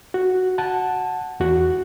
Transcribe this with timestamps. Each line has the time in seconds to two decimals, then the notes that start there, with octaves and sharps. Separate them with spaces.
0.14 F#4
0.58 F#5 A5
1.40 E2 F#4